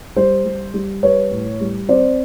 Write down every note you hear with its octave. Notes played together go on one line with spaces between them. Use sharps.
G3 C5
G3
G3
G3 B4 C#5
A2
G3
C4 C5 D5